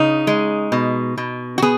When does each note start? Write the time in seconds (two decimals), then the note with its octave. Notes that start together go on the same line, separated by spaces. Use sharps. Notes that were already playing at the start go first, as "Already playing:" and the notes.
Already playing: C#3 D#4
0.27 G#3
0.72 B2
1.18 B2
1.58 F#4
1.62 B3 G#4